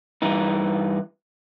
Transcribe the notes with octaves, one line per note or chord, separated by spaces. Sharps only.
G2 E3 D#4